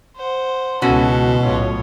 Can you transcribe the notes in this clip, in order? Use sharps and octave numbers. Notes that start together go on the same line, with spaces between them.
C5 F#5
C#2 B2 E3 C#4 F#4 A4
B1 A2 F4 C#5